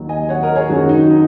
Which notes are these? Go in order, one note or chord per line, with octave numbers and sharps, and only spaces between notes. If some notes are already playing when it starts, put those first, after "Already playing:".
Already playing: D#2 D#3 F#3
D#5 G#5
C#5 F#5
A#4 D#5
G#4 C#5
F#2 D#3 F#3 F#4
D#4
D#4